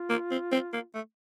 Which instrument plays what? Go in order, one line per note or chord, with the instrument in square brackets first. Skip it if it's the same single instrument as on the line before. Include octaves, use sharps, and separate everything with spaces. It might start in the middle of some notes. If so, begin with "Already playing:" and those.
Already playing: [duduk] F4
[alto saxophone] A#3
C4
C4
A#3
A3